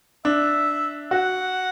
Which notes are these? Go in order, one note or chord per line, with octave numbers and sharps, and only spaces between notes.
D4 E5
F#4 F#5